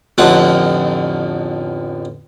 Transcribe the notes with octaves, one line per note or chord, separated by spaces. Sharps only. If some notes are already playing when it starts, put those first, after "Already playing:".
A1 F2 D3 D#4 F#5